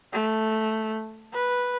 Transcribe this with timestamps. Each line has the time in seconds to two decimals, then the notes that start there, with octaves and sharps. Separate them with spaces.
0.13 A3
1.33 B4